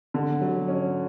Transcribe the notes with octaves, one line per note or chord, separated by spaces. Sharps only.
D3
F#3
C#4